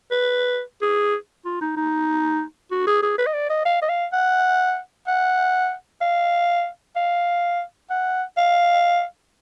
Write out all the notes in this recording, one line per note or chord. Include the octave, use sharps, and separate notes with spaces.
B4
G#4
F4
D#4
D#4
F#4
G#4
G#4
B4
D#5
D5
D#5
F5
D#5
F5
F#5
F#5
F5
F5
F#5
F5